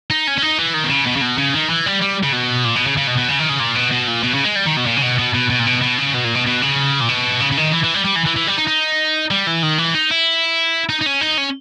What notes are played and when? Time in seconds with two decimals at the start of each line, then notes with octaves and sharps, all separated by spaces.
0.10 D#4
0.27 C#4
0.38 C#4
0.42 D#4
0.59 E3
0.74 D#3
0.84 B2
0.90 C#3
1.06 B2
1.17 C#3
1.22 B2
1.38 C#3
1.54 D#3
1.70 E3
1.86 G3
2.01 G3
2.23 C#3
2.32 B2
2.64 A#2
2.75 B2
2.87 C#3
2.97 C#3
3.07 B2
3.17 B2
3.28 C#3
3.39 D#3
3.49 C#3
3.60 A#2
3.75 B2
3.92 B2
4.08 A#2
4.24 B2
4.34 C#3
4.44 G#3
4.56 G3
4.66 D#3
4.77 B2
4.86 A#2
4.97 C#3
5.03 B2
5.19 B2
5.34 B2
5.50 B2
5.59 A#2
5.66 B2
5.82 B2
5.98 C#3
6.14 B2
6.24 A#2
6.35 B2
6.46 B2
6.61 C#3
7.01 A#2
7.09 B2
7.40 C#3
7.51 C#3
7.57 D#3
7.72 E3
7.84 E3
7.94 G3
8.05 G3
8.16 E3
8.26 E3
8.36 E3
8.47 G3
8.57 D#4
8.67 D#4
9.31 G3
9.47 E3
9.63 D#3
9.78 E3
9.95 D#4
10.11 E4
10.89 D#4
11.01 D#4
11.06 C#4
11.21 D#4
11.38 C#4